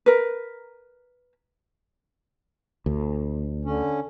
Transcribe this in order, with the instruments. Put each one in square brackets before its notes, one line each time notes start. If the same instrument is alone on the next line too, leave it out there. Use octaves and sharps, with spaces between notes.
[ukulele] A#4 B4
[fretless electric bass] D2
[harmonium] D3 C#4